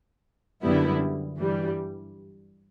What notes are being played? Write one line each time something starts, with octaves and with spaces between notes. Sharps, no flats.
F#2 D3 G3 B3 E4
G2 E3 G3